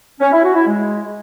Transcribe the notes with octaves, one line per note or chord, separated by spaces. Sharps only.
C#4
E4
F#4
E4
G#3